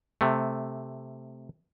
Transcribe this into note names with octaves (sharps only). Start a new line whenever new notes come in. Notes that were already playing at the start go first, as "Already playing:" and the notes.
C3 A3